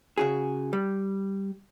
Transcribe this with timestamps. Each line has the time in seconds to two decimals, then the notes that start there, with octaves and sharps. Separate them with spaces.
0.18 C#3 F#4 G#4
0.73 G3